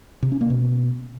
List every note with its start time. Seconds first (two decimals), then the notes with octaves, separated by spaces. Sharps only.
0.23 C3
0.32 C#4
0.41 A#3
0.50 B2